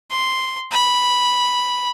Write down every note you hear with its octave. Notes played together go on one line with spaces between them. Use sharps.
C6
B5